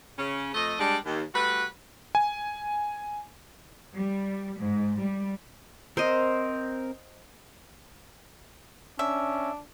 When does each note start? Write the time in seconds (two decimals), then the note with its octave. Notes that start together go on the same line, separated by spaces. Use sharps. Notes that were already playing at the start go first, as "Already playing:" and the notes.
0.19 C#3 C#4
0.55 F2 A3 D#5
0.80 G3 G#3 D4
1.06 D#2
1.35 G3 A3 F#4 B4
2.15 G#5
3.96 G3
4.61 G#2
5.01 G3
5.97 C4 A#4 C5 D#5
8.99 C#4 D4 E5